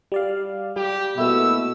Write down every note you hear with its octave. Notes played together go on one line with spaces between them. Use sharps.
G3 D5 F5
G3 G4
B2 A3 A#3 E4 E6